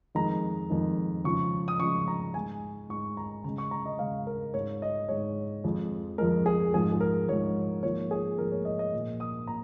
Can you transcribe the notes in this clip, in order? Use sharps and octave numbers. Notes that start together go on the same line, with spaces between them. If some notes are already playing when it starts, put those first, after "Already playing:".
F2 D#3 G#3 A#5
F2 D#3 G#3
C#3 F3 G#3 C#6
D#6
C#3 F3 G#3 C#6
A#5
G#2 G#3 G#5
G#2 G#3 C#6
A#5
C#3 G#3 A#5
C#6
A#5
D#5
C#3 G#3 F5
A#4
G#2 G#3 C#5
D#5
G#2 G#3 C#5
F2 F3 G#3
F2 F3 G#3 A#4
G#4
G#2 F3 G#3 G#4
G#4
A#4
G#2 F3 G#3 C#5
G#2 F3 A#3 C#5
G#4
G#2 F3 A#3 A#4
C#5
D#5
D#5
A#2 F3 A#3
D#6
A#2 A#5